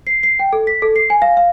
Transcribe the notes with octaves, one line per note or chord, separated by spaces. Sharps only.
C7
C7
G5
A4
B6
A4
C7
G#5
F5
F5